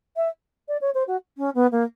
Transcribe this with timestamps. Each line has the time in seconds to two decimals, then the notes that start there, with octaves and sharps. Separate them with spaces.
0.16 E5
0.68 D5
0.81 C#5
0.94 C5
1.07 F#4
1.38 C#4
1.55 B3
1.72 A#3